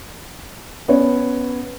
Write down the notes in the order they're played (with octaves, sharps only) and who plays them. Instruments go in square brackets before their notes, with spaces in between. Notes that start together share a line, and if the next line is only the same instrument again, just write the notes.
[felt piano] B3 C#4 B4 C#5